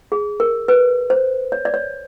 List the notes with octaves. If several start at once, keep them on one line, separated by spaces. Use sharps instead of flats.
G#4
A#4
B4
C5
C#5
D5
C#5